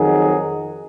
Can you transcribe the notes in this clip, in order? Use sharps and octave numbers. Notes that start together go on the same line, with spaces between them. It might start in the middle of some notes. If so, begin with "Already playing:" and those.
Already playing: F2 D#3 F#3 G#4